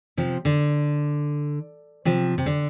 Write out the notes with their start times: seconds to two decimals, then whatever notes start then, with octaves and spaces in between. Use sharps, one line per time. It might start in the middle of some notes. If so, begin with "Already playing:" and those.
0.17 C3 F3
0.45 D3
2.05 C3 F3
2.38 C3
2.46 D3